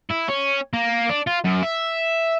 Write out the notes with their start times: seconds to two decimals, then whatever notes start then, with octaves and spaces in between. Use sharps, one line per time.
0.11 E4
0.29 C#4
0.74 A#3
1.10 D4
1.27 F4
1.44 F#2
1.63 E5